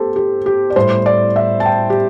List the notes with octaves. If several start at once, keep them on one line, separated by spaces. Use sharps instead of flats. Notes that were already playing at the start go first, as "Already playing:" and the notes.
Already playing: A3 G4 A4 C5
G4
G4
D5
A2 G3 C5
D5
E5
A5
G5
G4